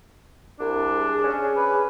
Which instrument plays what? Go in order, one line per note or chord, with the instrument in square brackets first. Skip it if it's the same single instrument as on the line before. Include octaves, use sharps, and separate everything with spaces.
[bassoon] C2 [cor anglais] D4
[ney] G#4
[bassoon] C#4
[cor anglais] B4